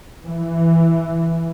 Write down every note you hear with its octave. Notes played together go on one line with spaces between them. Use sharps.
E3